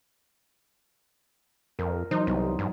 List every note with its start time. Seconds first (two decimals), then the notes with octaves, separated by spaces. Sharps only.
1.79 F2 A#4
2.11 E3 F#3 D#4 C5
2.27 C2 G3 B3 D#4
2.59 G2